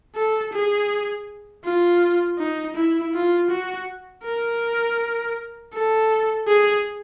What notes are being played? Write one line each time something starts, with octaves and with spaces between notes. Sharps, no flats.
A4
G#4
F4
D#4
E4
F4
F#4
A#4
A4
G#4